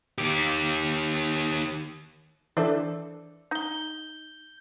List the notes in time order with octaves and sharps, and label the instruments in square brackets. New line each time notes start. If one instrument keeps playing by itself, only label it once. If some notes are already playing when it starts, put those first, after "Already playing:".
[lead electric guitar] D#3 G4
[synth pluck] E3 [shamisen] D4 C5 E5 [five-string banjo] A4 D5
[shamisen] D#4 [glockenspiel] G6 G7